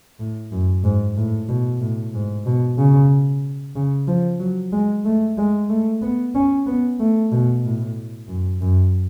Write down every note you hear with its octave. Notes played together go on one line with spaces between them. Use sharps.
A2
F#2
G#2
A2
B2
A2
G#2
B2
C#3
C#3
F3
F#3
G#3
A3
G#3
A3
B3
C#4
B3
A3
B2
A2
F#2
F#2